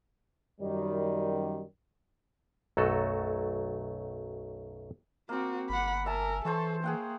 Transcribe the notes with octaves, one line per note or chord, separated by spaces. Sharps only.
F#2 D#3 G3
B1 F#2 F#3 A3 F#4 A4
A#3 C4 F#4 D6
G1 F#5 B5
A#4 E5 G#5 A5
E3 A4 C5 A5 C#6
A#3 G#4 F#5 G5